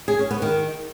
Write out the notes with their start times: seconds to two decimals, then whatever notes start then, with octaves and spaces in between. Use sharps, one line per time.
0.08 G#4
0.19 C#4
0.31 B3
0.42 D#3